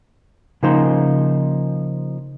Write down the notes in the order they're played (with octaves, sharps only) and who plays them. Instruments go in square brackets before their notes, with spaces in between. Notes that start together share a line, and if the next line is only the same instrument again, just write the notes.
[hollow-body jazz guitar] C#3 F3 A#3 D#4 C5